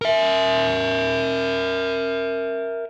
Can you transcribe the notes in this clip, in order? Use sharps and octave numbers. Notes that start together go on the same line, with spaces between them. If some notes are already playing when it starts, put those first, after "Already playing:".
A#4 E5